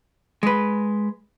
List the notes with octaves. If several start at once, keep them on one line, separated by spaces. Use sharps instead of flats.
G#3 B4